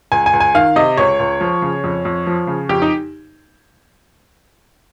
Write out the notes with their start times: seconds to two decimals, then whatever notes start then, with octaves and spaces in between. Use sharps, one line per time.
0.12 C#2 G#5
0.26 G#5
0.33 C#2
0.40 G#5
0.54 D#3 F5
0.76 C3 D#5
0.97 C#2 C#5
1.19 C#2
1.41 F3
1.62 C#3
1.84 F2
2.05 F2
2.27 F3
2.47 C#3
2.69 F2 G4
2.82 D#4